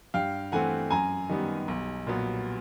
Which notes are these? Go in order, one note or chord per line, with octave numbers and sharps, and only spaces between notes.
G2 F5 G5
E3 A3 C4 F#5 G#5
F#2 G#5 A#5
D#3 G3 B3
B1
A#2 F#3 B3